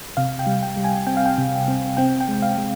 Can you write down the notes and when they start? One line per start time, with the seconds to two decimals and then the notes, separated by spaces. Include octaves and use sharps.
0.17 C3 F5
0.39 G5
0.46 G3
0.63 G5
0.77 G3
0.84 G#5
1.07 C4 G5
1.17 F5
1.26 G5
1.38 C3
1.68 C4
1.97 C4 G5
2.21 G5
2.28 G#3
2.42 F5
2.58 G#3